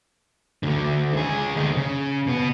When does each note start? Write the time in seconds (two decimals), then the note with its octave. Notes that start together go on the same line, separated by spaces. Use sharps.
0.63 D2 D3
1.14 C#2 G#4
1.56 D2 D#4
1.76 C#3
2.27 B2 B3